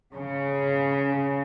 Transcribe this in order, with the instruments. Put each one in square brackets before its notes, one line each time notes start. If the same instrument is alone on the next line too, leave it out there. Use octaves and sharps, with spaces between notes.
[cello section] C#3